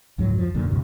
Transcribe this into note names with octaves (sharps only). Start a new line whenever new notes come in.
C#2 G#2 F3 F#3
F2 F3
F#2 A#2 D3
D2 G2 C3 E3